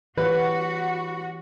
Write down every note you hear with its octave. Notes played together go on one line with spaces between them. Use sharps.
E3 F#4 G4 B4 C#5